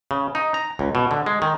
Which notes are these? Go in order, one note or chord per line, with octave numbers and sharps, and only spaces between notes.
C#3
D#4
A#5
C#2
B2
D3
G#3
D#3